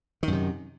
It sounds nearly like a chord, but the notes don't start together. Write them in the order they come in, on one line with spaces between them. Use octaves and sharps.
D#3 F#2 C3